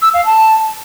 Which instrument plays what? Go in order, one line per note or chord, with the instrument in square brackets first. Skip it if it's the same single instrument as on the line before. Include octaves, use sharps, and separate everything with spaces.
[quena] E6
F5
A5